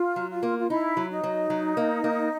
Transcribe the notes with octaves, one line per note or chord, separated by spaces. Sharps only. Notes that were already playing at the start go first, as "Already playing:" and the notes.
Already playing: F4
F#3
F4
A#3
F4
D#4 E4
F#3
D#4
F#3
F#3
A#3
A#3